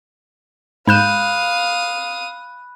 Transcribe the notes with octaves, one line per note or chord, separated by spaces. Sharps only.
G#2 F5 B5 D#6 F#6 G6 E7